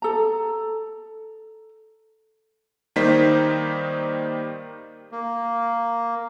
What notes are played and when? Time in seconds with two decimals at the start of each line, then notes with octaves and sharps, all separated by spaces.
0.02 A4 A#5
2.96 D#3 G3 A#3 D#4 C5 B6
5.12 A#3